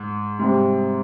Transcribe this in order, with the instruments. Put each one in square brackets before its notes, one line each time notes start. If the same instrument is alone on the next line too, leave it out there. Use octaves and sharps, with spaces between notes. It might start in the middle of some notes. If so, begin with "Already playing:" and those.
Already playing: [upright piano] G#2
[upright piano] G#2 [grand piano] C3 G3 C4